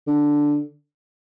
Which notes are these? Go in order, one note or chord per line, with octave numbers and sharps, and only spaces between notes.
D3